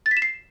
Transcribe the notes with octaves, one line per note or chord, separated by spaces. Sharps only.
A6
B6
E7
C7